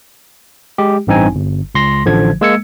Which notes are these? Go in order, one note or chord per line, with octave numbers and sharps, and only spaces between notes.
G#3 G4
A1 G2 C4 D#4 G#5
G1
C#2 C6 A#6
A1 D3 F3 G#6
G#3 A#3 E6 G#6 C#7